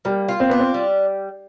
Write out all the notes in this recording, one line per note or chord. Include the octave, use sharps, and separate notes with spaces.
G3 A#3
F4
C4
B3 D4
C4
G3